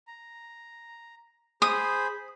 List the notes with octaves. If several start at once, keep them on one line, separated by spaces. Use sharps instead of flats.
A#5
G#4 C5 B5 D#6